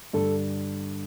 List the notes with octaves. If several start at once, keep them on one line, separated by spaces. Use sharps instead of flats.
G2 D3 A4